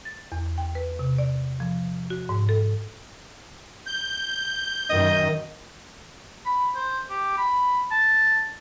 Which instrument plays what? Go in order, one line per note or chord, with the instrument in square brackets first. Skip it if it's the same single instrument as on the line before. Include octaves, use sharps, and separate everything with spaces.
[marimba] A6
E2
G5
B4
C3
D5
F3
F#4
G#2
A4
[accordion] G6
[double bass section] F#2 D#3 [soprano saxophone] D#5
[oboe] B5
C5
G4
B5
A5